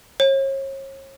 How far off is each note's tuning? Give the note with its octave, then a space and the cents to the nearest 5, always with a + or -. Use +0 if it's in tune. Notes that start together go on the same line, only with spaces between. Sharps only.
C#5 -35